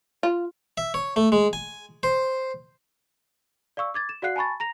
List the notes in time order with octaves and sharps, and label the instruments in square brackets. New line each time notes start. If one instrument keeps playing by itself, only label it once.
[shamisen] F4
[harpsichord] E5
C#5
A3
G#3
G#5
C5
[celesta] D5 F5 C#6 E6
D6 G#6 A6
E7
F#4 D5 F5 F#5 F#6 C7
G#5 A5 B5 C#6 A6
A#5 A#6 F7